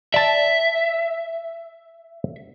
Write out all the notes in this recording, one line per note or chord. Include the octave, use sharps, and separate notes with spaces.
D5 E5 A5